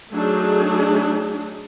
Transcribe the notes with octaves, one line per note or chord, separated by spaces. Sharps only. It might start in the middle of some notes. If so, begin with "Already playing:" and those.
F#3 A3 D4 D#4 G#4